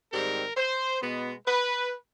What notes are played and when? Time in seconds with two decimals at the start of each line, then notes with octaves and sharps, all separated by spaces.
0.13 G#2 D#3 G3 C4 A#4
0.57 C5
1.02 B2 G#3 B3
1.47 B4